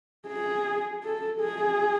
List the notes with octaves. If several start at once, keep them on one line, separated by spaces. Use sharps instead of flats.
G#4
A4
G#4